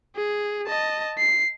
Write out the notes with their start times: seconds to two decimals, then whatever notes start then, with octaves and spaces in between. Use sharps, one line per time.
0.16 G#4
0.67 D#5 A5
1.18 C7